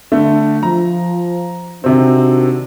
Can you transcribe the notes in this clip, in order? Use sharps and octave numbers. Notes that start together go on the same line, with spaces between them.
D3 A3
F3 A#5
C3 D#3 C4 D4 F#4